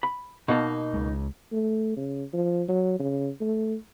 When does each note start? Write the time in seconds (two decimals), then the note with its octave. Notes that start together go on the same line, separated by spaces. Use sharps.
0.03 B5
0.48 B2 A#3 D#4 A5
0.94 C#2 G#3
1.52 A3
1.97 C#3
2.34 F3
2.69 F#3
3.00 C#3
3.41 A3